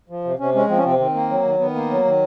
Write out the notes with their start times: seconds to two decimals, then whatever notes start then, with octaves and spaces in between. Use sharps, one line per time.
0.09 F3
0.24 C3
0.39 C3 C#4
0.55 G#3 C#4
0.69 F3 C4
0.77 C#4
0.84 C3 C4
0.99 D#3 C4
1.14 A#3
1.30 F#3
1.44 D#3
1.59 D#3 B3
1.74 A#3
1.90 F#3
2.05 D#3